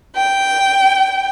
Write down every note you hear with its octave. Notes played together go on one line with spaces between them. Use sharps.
G5